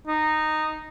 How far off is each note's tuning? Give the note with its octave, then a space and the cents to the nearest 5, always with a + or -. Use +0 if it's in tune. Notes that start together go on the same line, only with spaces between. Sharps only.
D#4 -10